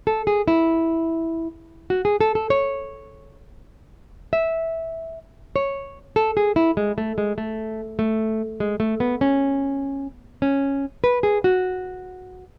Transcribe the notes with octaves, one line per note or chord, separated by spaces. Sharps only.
A4
G#4
E4
F#4
G#4
A4
A4
C#5
E5
C#5
A4
G#4
E4
G#3
A3
G#3
A3
A3
G#3
A3
B3
C#4
C#4
B4
G#4
F#4